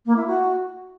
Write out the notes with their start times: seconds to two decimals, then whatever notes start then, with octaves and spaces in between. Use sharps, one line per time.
0.06 A#3
0.16 E4
0.27 F#4